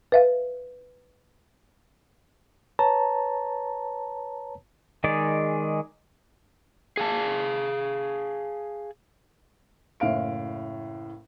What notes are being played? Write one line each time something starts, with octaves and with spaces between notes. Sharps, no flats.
B4 E5 F5
B4 C#5 A5 A#5
D#3 G#3 G#4 D5
G#4 F5 A5
F#1 A2 F5 D7